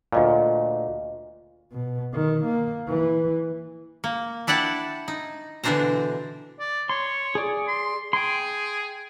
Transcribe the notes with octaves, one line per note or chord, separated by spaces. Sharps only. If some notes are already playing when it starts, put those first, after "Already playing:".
D2 A#2 F4 D#5 F5
B2
D#3
A#3
E3
A#3
D4 E4 D5 F#5 G5 A5
D#4
B2 D3 E3 D4 C5 A#5
D5
C#5 C6
G#4 D5
C6
G#4 G5 C6